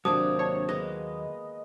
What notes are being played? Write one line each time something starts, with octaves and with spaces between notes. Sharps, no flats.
D#2 G#2 C3 F#3 A#3 D4 D6 D#6
D4 C#5
G#3 A#3 B3 D#5